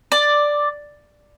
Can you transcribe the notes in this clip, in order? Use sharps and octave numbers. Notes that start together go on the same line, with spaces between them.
D5